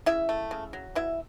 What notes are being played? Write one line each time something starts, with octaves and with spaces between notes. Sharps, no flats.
C#3 E4 E5
A3
C#3
F#3
B2 E4 E5